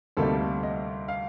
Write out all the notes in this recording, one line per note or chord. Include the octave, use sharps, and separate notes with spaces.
D2 C3 G3 A#3 D#4 A4
D#5
F5